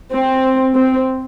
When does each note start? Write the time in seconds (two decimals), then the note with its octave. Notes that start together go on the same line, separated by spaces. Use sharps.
0.13 C4
0.77 C4